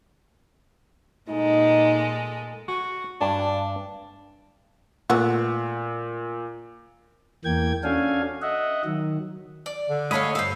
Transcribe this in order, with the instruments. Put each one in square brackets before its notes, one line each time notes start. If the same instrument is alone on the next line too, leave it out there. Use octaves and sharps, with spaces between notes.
[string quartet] A#2 G#3 A4 [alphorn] D#4
[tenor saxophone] F#4 [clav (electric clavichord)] G#5
[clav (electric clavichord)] G2 G#5 [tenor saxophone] D4
[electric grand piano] A#2 [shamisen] A3 B3 F#4
[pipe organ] E2 E3 A#3 G5 G#6
C#4 D4 F#4 A4 F5 G#5
D#5 E5 F#5
D#3 F#3
[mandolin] D5
[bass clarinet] D3
[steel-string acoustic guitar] A3 C#5 [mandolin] G#4 A4 F5 [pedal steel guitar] D#5 B5
[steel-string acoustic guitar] G2 F5 [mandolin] C5 E6